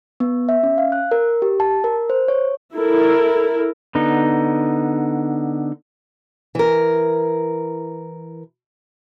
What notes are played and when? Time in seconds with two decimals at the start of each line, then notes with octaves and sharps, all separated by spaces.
0.20 B3
0.49 E5
0.63 C#4
0.78 F5
0.92 F#6
1.11 A#4
1.42 G4
1.60 A5
1.84 A#4
2.10 C5
2.28 C#5
2.76 E4 A4 A#4
3.95 D3 B3 D#4
6.55 E3 A#4